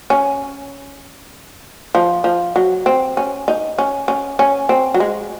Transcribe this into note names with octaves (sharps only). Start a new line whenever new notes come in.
C#4
F3
F3
F#3
C4
C#4
D#4
C#4
C#4
C#4
C4
F#3
G#3